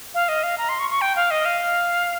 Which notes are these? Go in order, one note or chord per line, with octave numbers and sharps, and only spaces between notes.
F5
D#5
F5
A#5
C6
C#6
C#6
G5
F5
D#5
F5